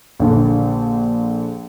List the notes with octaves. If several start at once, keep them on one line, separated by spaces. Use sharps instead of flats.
A#1 D3